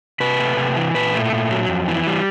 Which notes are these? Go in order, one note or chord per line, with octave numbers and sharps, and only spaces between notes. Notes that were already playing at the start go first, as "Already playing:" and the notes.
C3 B4
A3
C3
E3
A#2 B4
A3
A#2
F#3
F2
E3
G3